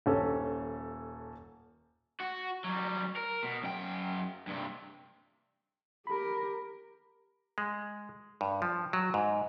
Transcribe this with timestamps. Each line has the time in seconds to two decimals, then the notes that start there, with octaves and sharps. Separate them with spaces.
0.06 D#1 C#4 A4
2.20 F#4
2.64 F#3 G3
3.16 A#4
3.44 B2
3.63 F#2 G5
4.47 G2 C3
6.07 G4 A#4 B5
7.58 G#3
8.41 G2
8.62 F3
8.93 F#3
9.14 G#2